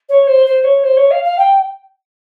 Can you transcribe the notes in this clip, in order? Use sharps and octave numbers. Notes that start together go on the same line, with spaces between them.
C#5
C5
C5
C#5
C5
C#5
F5
F5
G5